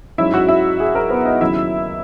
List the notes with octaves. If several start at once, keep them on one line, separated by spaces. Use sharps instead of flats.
G#2 F#3 C#4 E4 E5
F#4 F#5
E4 E5
G#4
A#4
B3 B4
D#4 D#5
D#2 C#3 F#3 C#4 E4 E5